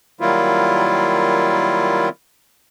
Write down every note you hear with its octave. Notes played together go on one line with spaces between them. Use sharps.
D#3 F#3 G3 A#3 E4 F4